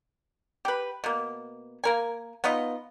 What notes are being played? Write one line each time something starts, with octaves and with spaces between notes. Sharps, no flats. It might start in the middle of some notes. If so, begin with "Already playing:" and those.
G4 B4
B2 A#3
A#3 A#4 G#5
B3 D#4 F4 D#5